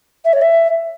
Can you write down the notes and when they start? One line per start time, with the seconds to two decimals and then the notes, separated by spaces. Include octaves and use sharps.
0.24 E5
0.33 C#5
0.41 E5